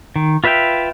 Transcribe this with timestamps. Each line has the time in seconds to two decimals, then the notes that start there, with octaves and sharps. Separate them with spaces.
0.16 D#3
0.44 F4 B4 E5 F5 G5